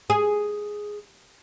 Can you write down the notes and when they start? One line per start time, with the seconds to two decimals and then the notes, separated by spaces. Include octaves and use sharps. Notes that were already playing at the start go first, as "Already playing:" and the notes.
0.10 G#4